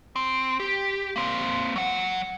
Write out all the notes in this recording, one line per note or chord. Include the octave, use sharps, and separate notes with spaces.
C4
G4
A#3 C4
F#3 F#5